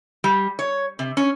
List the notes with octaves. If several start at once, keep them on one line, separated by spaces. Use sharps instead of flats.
G3
C#5
C3
C#4